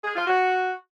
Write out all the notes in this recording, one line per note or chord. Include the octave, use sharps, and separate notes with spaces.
G#4
F4
F#4